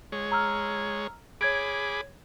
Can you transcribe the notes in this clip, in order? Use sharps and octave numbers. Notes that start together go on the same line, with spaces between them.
G#3 C#5
A#5 E6 F6
G#4 C#5 B5 D6 G#6 D7